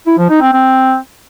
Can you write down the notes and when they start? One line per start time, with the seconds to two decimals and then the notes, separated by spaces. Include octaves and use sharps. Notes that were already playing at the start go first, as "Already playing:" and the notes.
0.06 E4
0.18 F3
0.30 D#4
0.41 C4
0.53 C4